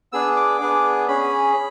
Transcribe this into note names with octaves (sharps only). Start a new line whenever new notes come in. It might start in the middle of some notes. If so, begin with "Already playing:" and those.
B3 D4 G#4 E6
D6
B3 D4 G#4
C#4 G#4 B5